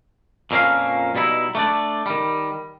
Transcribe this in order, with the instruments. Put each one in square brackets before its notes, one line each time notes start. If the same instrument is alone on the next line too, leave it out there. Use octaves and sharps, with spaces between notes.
[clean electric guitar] F2 A#2 A#3 C#4 F5
B2 G3 D#4 E4
A3 D4 D5
D#3 G3